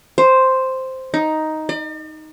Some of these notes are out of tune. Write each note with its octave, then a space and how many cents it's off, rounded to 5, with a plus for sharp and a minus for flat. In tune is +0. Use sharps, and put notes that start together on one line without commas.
C5 +0
D#4 +5
D5 +45